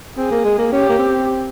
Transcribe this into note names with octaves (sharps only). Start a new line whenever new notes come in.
C4 G#4
A#3
G#3
A#3
C#4 G4
A#3
C4